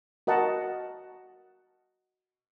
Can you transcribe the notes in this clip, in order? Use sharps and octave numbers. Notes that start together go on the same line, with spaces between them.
F#4 A#4 D#5 F#5 A5